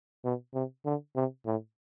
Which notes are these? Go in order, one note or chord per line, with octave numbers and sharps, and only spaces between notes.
B2
C3
D3
C3
A2